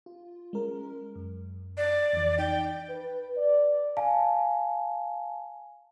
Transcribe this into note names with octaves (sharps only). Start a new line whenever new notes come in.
F4
G#3 C#4 A#4
F#2
D5
F2 E3
D#4 G5
B4
D5
F5 G#5 A5